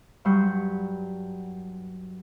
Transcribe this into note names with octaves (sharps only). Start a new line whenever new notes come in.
G2 F#3 G3 C6 C#6 G6